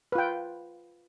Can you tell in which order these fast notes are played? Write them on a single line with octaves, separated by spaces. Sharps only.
B4 F4 G5